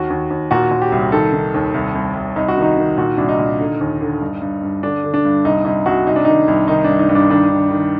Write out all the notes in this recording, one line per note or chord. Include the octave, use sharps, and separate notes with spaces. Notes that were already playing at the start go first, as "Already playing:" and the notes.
Already playing: D#2 F#4
D#2
D#2
A#2 F#4
A#2
G4
C2
D#3 A4
D#3
D#2
C2
C2
C2
C2 D#4
F#4
D#3 D#4
D#3
A#2 F#4
C2 D4
D#4
A#2
D3
D#2
D3
G2
G2
G2
D3 D4
D3
D4
G2
C2 D#4
C2 D#4
C2 F#4
C2 D#4
D4
D#3 D#4
C2
D#3 D#4
D4
G2
D#4
G2
D4
D#3 D4
D#3
D#3